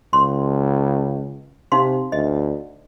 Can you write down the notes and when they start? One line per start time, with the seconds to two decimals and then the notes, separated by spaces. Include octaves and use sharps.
0.13 C#2 C6
1.72 C3 D#4 F5 C6
2.12 D2 D#5